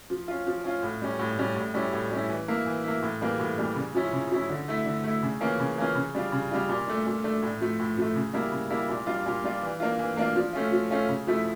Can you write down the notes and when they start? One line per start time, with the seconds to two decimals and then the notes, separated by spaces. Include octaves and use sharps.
0.10 F3
0.28 C#4 F4
0.47 F3
0.64 C#4 F4
0.83 A2
1.02 G3 C#4
1.19 A2
1.38 G3 C#4
1.56 A2
1.74 G3 C#4 E4
1.93 A2
2.11 G3 C#4 E4
2.30 E3
2.48 A#3 E4
2.66 E3
2.84 A#3 E4
3.03 A2
3.21 E3 G3 A#3
3.39 A2
3.58 E3 G3 A#3
3.76 C#3
3.95 F3 C#4 E4
4.13 C#3
4.31 F3 C#4 E4
4.50 D3
4.68 A3 E4
4.86 D3
5.04 A3 E4
5.23 C#3
5.41 E3 A#3 C#4 F4
5.60 C#3
5.78 E3 A#3 C#4 F4
5.95 C#3
6.15 G3 D4 F4
6.32 C#3
6.51 G3 D4 F4
6.69 A#2
6.87 A3 D4
7.06 A#2
7.24 A3 D4
7.42 A2
7.61 F3 A3
7.80 A2
7.98 F3 A3
8.16 C#3
8.34 G3 A#3 E4
8.52 C#3
8.70 G3 A#3 E4
8.89 A#2
9.07 G3 D4 F4
9.26 A#2
9.44 G3 D4 F4
9.62 E3
9.80 A#3 D4 F4
9.99 E3
10.17 A#3 D4 F4
10.36 F3
10.53 A3 C#4 F4
10.72 F3
10.91 A3 C#4 F4
11.09 C#3
11.27 F3 A3 E4